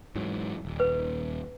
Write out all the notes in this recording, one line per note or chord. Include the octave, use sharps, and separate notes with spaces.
G#2 E3 F#3
D#1
B4